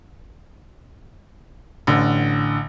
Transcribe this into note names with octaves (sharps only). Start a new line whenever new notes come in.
A1 D3